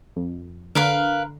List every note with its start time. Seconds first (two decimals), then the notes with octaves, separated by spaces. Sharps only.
0.16 F2
0.75 D3 A#4 B4 F5